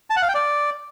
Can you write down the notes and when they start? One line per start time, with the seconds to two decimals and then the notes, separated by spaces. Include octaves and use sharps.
0.10 A5
0.16 F#5
0.22 F5
0.29 G5
0.35 D5